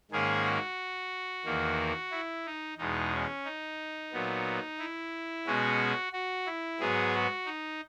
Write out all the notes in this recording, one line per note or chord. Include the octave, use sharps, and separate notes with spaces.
G#2 D#3 A#3 C#4 G#4
F#4
E2 D#3 A#3
E4
D#4
E2 B2 G#3 D#4
C#4
D#4
A#2 F#3 B3
E4
B2 G#3 C#4 F#4
F#4
E4
G#2 F#3 B3 G#4
F#4
D#4